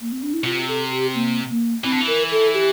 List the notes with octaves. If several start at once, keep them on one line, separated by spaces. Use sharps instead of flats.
A#3
C4
D4
E4
C3 F4
A4
G4
A#3
A#3
E3 C4
D3
E3
A#4
A4
G4